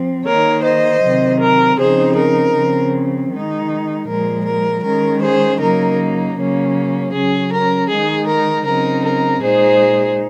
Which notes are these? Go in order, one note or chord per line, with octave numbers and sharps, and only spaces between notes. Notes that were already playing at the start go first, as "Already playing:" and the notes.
Already playing: F3 C4
D#3 A#3 D#4 A#4 C#5
C5 D#5
C3 D#3 F#3 C4
A#4
C#3 F3 C4 D#4 G#4 C5
A#4
C#3 F3 C4
D#3 G#3 D#4
A#2 F3 G#3 A#4
A#4
D#3 G#3 C#4 A#4
G#4 C5
C#3 F#3 A#3 D#4 A#4
C#3 F#3 A#3 C#4
C#3 F#3 C#4 G#4
A#4
D#3 G#3 D#4 G#4
A#4
C#3 F#3 C4 D#4 A#4
A#4
A#2 G#3 D#4 G#4 C5